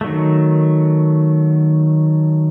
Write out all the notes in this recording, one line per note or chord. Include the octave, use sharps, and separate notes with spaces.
D#3 F#3 A3